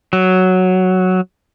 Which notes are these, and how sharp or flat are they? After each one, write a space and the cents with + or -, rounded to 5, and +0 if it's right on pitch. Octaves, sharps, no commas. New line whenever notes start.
F#3 +0